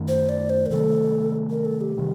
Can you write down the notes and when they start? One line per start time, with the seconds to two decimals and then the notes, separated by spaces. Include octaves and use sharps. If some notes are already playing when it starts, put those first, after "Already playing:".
Already playing: F#2 D#3 A3
0.08 C5
0.29 D5
0.50 C5
0.66 A#4
0.70 C3 D#3 F#3 A3 A4
1.50 A#4
1.65 A4
1.81 G4
1.97 C3 D#3 G3